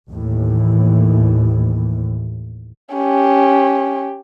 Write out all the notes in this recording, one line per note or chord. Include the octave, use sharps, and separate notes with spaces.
D#2 A2 E3
C#4 G4